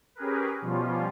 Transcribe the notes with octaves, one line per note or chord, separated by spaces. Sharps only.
C#4 G4 G#4 A#4 B4
B2 F3 G3 C#4 F4